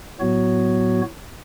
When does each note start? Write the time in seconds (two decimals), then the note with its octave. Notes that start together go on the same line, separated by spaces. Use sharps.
0.20 A2 F#3 B3 F#4 C#5